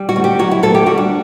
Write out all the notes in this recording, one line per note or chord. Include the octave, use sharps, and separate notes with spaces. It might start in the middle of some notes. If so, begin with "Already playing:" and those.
Already playing: G3
F#4
D2
G4
F#3 F#4
E4
D2 A4
G4
G3 F#4
D4